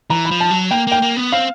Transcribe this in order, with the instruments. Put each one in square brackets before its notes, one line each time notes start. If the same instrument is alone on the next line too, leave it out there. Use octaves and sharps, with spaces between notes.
[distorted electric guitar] E3 [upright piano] A#5
[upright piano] B5
[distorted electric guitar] F3
[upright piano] A5
[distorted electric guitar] F#3
[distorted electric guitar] A#3 [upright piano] G5
[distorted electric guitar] A#3 [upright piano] G5
[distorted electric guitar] A#3
B3
[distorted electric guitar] C4 [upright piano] F5